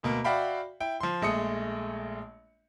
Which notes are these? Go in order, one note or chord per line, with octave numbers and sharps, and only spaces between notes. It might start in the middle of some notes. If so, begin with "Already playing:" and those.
D2 B2 A#3
F#4 D5 E5 F5 G5 B5
E4 G5
F3 C6
A#1 G#3 A3 D#6 C#7